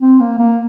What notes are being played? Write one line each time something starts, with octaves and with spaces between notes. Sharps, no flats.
C4
A#3
A#3